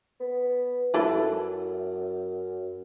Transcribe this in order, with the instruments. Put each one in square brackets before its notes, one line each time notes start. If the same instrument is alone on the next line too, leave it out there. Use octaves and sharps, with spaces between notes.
[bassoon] B3
[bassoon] F#2 [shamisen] E4 A4 B4